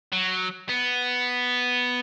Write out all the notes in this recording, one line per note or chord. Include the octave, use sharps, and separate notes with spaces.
F#3
B3